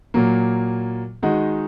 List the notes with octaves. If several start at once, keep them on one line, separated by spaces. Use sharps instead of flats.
A#2 F#3 A#3
D#3 G#3 D#4 F#4